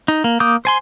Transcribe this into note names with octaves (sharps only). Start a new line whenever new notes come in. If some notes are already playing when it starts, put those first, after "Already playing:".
D#4
A#3
A#3 D6 D#6 G6
C5 G#5 C6